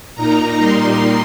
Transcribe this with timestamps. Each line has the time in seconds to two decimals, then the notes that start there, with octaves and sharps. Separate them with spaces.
0.15 A#2 A#3 D#4 A#5
0.58 A#2 G3 A#3 D#4 C6